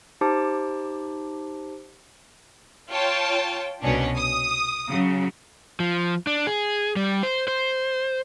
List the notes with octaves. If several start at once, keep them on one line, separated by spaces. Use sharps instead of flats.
D#4 G4 C5 A5 D6
F4 C#5 G5 A5
C2 B2 C#4 D4
D#6
C#3 F#3
F3
D4
G#4
G3
C5
C5